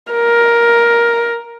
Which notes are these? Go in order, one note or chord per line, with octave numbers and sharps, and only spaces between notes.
A#4